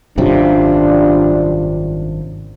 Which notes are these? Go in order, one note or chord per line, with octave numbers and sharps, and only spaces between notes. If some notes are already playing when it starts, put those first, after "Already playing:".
G#1 F#2 C3 G3 D4 F4